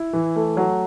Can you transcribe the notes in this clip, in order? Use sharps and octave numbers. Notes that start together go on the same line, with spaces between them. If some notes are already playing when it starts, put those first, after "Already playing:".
Already playing: E4
E3
A3
F#3